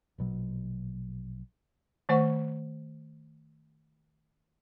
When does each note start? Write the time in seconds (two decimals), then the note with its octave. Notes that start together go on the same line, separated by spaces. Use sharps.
0.18 A#1 B2 F#3
2.09 D#3 A3 C5 F#5 C#6